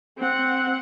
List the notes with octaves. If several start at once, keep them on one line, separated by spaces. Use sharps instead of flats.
C4 F#5